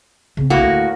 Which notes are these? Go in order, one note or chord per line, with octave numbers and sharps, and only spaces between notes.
C#3 C4
D1 C2 A2 A#3 F#4
D2